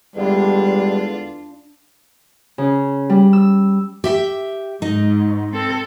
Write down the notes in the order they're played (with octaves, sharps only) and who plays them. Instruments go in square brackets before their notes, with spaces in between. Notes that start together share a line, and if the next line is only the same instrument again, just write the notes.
[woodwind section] E2 D3 G#3 [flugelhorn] G3 [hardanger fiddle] D4 F4
[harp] C#3
G3
E6
[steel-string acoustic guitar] G4 E5 G5
[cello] G#2 [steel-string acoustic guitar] D#4 D#5
[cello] C4 A4